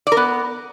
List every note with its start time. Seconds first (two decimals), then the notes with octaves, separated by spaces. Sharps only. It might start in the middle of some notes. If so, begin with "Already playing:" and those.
0.07 D5
0.12 A#4
0.17 B3